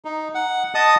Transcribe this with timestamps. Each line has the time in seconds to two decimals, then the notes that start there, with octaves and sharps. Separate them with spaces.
0.05 D#4
0.35 F#5
0.75 D#5 A5 D#6